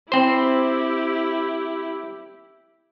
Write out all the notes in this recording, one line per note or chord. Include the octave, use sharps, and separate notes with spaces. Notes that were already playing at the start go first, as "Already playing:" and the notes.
C4 E4 G4 C5